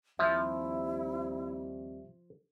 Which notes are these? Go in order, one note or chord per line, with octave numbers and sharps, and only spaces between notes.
D#2 F3 G3 C4 E4 E5